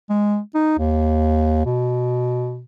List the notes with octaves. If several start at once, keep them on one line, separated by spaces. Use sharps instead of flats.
G#3
D#4
D#2
B2